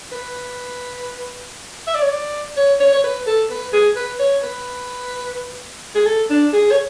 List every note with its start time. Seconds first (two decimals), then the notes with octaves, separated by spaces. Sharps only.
0.12 B4
1.87 E5
1.95 D5
2.02 C#5
2.09 D5
2.57 C#5
2.80 C#5
2.93 C#5
3.04 B4
3.27 A4
3.51 B4
3.73 G#4
3.96 B4
4.20 C#5
4.43 B4
5.95 G#4
6.06 A4
6.30 D4
6.53 G#4
6.72 C#5